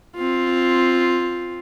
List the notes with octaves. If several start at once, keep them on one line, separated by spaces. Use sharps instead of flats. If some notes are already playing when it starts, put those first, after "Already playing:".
C4 F4